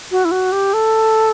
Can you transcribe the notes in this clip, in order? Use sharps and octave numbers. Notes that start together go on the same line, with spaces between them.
F#4
E4
F#4
G4
A4